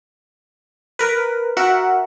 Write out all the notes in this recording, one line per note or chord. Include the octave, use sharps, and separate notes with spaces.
A#4 B4
F#4 A#4 E5 F#5